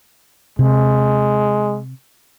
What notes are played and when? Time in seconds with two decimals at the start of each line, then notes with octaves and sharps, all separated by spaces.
0.59 C3 G#3